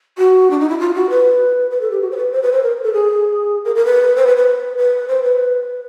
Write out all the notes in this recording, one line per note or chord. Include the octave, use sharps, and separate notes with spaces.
F#4
D4
D#4
E4
F4
F#4
B4
B4
A4
G4
F#4
C5
B4
C5
B4
C5
A#4
A4
G#4
A#4
A#4
B4
C5
B4
B4
B4
C5
B4